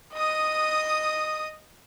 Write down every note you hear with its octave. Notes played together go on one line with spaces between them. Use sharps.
D#5 D#6